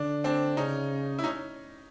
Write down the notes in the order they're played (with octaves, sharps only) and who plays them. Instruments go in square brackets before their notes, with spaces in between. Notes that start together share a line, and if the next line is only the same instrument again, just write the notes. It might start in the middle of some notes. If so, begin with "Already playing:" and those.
Already playing: [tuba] D3 [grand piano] D4
[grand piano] C4 D4
[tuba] C#3 [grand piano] C#4 D#4
[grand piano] E4
C#4 D#4